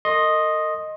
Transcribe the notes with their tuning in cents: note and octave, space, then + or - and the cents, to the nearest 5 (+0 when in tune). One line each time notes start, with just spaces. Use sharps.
A#4 -45 D#5 +0 C6 +25